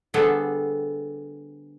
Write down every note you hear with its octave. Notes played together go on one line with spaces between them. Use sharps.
D3 G3 B3 G#4 A4 C5